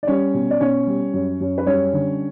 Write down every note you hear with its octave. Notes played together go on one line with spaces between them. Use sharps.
D5
G3 C#4 C#5
B2
D5
B2 C#4 C#5
G3
F#2
F#2
B4
G3 C#4 C#5
D3